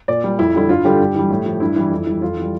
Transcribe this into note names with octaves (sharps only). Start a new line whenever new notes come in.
A#2 D5
G3
F2 E4
D3 G3 E4
G2 F4
D3 G3 G4
G2
E3 G3
A2
F3
G2 E4
E3 G3
F2
E3 G3
F2 F4
E3
G3